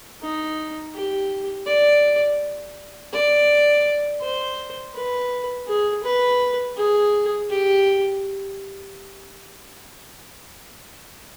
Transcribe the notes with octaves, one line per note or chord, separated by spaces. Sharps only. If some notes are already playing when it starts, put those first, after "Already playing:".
D#4
G4
D5
D5
C5
B4
G#4
B4
G#4
G4